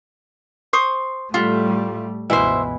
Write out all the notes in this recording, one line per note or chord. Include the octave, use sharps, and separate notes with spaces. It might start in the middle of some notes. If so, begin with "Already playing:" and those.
C5 C#6 D#6
A2 G3 A3 F4 G4 E5 F#5
C#2 G2 B2 E3 E4 C5 E5